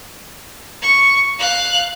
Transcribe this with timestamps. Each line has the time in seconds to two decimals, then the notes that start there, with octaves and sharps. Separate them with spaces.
0.82 C#6
1.39 F5 F#6